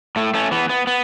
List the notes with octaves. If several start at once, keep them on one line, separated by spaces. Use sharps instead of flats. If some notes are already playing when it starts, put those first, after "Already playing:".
A2 A3
A3 C#4
E3 B3
B3
B3